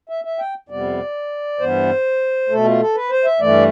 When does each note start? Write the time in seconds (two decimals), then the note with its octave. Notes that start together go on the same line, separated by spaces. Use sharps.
0.09 E5
0.25 E5
0.39 G5
0.69 F2 C3 G3 B3 D5
1.59 G2 E3 B3 C5
2.49 B2 A3 A4
2.65 F4
2.80 A4
2.95 B4
3.10 C5
3.25 E5
3.40 G2 E3 A3 D5